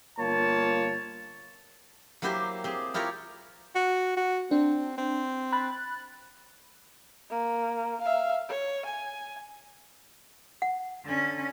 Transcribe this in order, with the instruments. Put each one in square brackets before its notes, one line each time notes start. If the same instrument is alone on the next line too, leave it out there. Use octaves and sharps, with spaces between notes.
[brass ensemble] G1 A#3 F4 C#5 A5
[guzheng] F#3 A#3 E4 G4 C5
C4 G4 G#4
E4 F4 G4 A#4 C#5
[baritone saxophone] F#4
F#4
[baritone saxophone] C4 [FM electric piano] D4
[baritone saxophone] C4
[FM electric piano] B5 F#6 A6
[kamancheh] A#3
E5 F5
C#5
G#5
[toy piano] F#5
[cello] D3 C#4